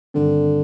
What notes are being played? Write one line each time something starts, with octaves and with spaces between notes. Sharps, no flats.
G2 D3 D#3 G3 C4